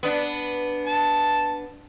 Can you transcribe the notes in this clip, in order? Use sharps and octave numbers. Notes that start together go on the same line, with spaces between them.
B3 D4
A5